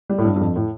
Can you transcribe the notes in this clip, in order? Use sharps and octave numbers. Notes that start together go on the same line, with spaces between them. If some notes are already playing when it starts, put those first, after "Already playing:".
G3
A2
G2
G2
F2
A2